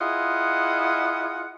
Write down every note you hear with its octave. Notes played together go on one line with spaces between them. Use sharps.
E4 F4 G#4 D#5 F#5